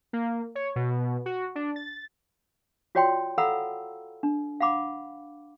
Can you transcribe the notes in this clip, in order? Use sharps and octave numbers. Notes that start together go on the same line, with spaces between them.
A#3
C#5
B2
F#4
D4
A6
F4 F#4 C#5 D5 G5 C6
A4 F5 F#5 A#5 B5 E6
D4
F5 F#5 B5 D6